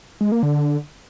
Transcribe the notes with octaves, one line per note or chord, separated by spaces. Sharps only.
G#3
A#3
D3